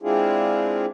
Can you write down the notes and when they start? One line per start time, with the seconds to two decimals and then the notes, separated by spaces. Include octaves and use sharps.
0.02 G#3 C4 D4 E4 F4 G#4